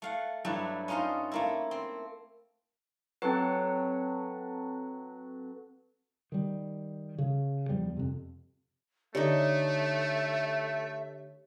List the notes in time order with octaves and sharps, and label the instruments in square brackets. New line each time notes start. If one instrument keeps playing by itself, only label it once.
[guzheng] A3 F5 F#5
G2 F#3 G3 A3 D4 E4
C#4 D#4 F4 C5 D#5
A3 A#3 E4
C4
[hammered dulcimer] F#3 A4 [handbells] C4 B4
[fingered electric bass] D#3 G3
C#3
E2 F3 G3
F2 C3
[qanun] D3 D#4 [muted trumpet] A3 [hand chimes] G4 C#5 [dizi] E5